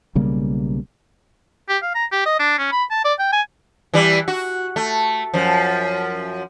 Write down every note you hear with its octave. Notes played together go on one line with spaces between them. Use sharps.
B1 C#3 G3 A#3
G4
F5
A#5
G4
D#5
D4
C#4
B5
A5
D5
G5
G#5
E3 G3
F#4
A3
F#2 F3